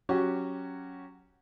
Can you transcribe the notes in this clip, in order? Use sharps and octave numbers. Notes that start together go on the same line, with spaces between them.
F#3 C#4 F#4 G4